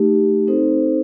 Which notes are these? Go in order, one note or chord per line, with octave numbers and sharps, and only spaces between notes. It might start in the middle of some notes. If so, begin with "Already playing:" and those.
Already playing: A3 D#4 G4
C4 D#4 A4 C5